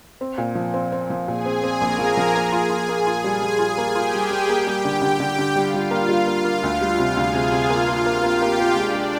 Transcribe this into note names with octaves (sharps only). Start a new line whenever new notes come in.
C4
A#2
F3
C4
C4
F3
A#2 G#4 G#5
C4
C4
A#1 A#4 A#5
F3
F3
A#3 G#4 G#5
F4
F4
A#3 G#4 G#5
F4
G3
G3 G#4 G#5
F4
A#3
F4 G4 G5
G3
G3
A#3
G3
D3
D3 G4 G5
D3
D3
G3 F4 F5
G3
A#3
G3
A#3
A#3
D2
G3
C3
D2 G#4 G#5
C3
C3
A#3 F4 F5
A#3
A#3
A#3 G4 G5
A#3
A#3
G#3 D4 D5
G#3